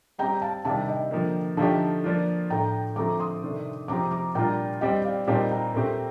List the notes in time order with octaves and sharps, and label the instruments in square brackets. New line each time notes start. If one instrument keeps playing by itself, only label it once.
[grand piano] G3 C4 G4 [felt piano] G5 A#5
[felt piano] F5 A5
[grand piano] C3 D#3 G3 D4 G4 [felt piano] F5 A5
[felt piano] D#5 G5
[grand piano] D3 F3 A#3
[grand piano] D3 F3 A3 D#4 G4 [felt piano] F5 A5
[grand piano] F3 A#3 D4 F4
[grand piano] A2 A3 D4 [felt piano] G5 A#5
[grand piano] D3 F3 A3 C4 [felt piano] A#5 D6
[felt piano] C6 D#6
[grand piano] C3 D#3 A3 D4
[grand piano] C3 F3 C4 G4 [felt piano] A#5 D6
[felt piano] A#5 D6
[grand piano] A#2 G3 D4 F4 [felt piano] G5 A#5
[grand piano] G3 C4 G4 [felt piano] D#5 G5
[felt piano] D5 F5
[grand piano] A#2 G3 C4 D#4 G4 [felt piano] F5 A5
[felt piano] G5 A#5
[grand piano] A#2 A3 C4 G4